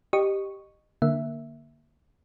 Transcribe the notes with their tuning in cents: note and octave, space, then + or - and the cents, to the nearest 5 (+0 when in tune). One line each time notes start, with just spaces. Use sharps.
G4 +0 D#5 -20 C#6 +0
D3 +15 A#3 +0 E5 +0